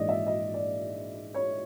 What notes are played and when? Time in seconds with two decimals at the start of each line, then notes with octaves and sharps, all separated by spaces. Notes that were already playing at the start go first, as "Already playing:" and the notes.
Already playing: A#1 G#2 E3 D5 D#5
0.08 E5
0.27 D#5
0.54 D5
1.34 C#5